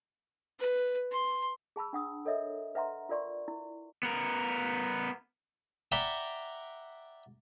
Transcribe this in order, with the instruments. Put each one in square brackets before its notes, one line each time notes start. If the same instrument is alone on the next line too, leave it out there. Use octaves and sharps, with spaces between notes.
[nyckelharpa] B4
C6
[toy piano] G#4 A5 B5 E6
D4 F#5 D#6
A4 A#4 C#5 D#5 E5
B4 E5 F#5 A#5 C6
F4 A#4 D5 C6 C#6
E4
[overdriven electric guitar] B3 A#4
[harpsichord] D5 E5 F#5 G5 A#5 B5